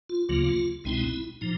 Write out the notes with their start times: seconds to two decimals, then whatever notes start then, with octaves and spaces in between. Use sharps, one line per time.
0.09 F4
0.29 D2 C#3 F#3 A#3 F4
0.84 C2 B2 G#3 C4 D#4 E4
1.41 A#2 F3 D#4